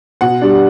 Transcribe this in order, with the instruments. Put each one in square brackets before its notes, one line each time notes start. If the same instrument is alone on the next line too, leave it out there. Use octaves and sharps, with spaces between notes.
[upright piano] B2 F#5
G3 D4